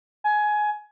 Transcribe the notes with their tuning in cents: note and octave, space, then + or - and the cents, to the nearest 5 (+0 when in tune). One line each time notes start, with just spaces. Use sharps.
G#5 +20